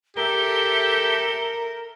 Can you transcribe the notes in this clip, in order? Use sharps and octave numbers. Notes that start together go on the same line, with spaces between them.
G4 A4 A#4 E5 G7